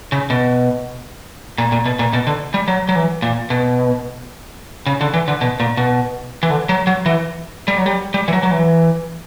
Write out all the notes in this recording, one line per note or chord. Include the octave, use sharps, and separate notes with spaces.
C#3
B2
A#2
A#2
B2
A#2
B2
D3
G3
F#3
F#3
E3
A#2
B2
C#3
D3
E3
D3
B2
A#2
B2
E3
D3
F#3
F#3
E3
G3
F#3
G3
G3
E3
F#3
F#3
E3